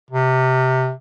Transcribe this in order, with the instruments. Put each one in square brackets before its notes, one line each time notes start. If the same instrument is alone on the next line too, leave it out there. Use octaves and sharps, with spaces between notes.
[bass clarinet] C3